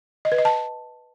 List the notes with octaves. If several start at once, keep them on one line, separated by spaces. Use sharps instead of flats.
D#5
B4
D#5
A5